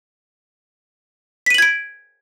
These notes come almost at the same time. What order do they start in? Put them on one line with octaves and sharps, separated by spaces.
B6 D#7 F#7 G#6 D7